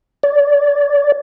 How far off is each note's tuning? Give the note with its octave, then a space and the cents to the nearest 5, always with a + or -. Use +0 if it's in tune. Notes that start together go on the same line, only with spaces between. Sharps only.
D5 -35